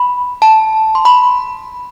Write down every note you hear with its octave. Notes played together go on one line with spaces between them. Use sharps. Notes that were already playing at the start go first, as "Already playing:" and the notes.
Already playing: B5
A5
C6
B5